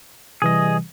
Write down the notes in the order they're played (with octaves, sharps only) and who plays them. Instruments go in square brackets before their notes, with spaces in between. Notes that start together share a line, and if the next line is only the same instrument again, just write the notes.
[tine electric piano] C3 E3 G3 [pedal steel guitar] G#4 D#5